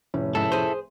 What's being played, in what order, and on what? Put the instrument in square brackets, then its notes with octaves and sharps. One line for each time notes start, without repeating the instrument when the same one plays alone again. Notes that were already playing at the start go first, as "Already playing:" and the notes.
[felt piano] F1 A2 C#4
[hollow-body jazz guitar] G#2 [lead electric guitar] E4 A4
[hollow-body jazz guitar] G#4 C5